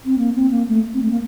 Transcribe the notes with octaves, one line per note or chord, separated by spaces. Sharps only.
C4
A#3
C4
A#3
A3
C4
A3
A#3